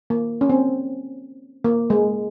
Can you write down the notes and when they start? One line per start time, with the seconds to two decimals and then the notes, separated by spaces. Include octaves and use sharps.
0.10 A#3
0.41 C#4
0.50 C4
1.64 A#3
1.90 G#3